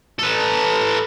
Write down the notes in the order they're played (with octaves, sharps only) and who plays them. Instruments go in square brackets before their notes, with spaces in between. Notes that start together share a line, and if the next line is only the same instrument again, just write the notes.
[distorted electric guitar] A4 B4